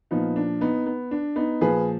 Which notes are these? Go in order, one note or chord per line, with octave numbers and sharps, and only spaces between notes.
A#2 F3 B3 D#4
D4
B3 D#4
B3
D4
B3 D#4
A#2 F3 G#4 B4